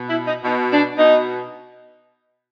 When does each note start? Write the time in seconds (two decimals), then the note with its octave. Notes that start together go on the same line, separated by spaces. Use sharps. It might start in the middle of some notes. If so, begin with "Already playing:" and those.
Already playing: B2
0.09 E4
0.27 D#4
0.44 B2 D#4
0.72 D4
0.98 B2 D#4